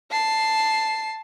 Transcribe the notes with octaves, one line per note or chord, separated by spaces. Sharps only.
A5 C7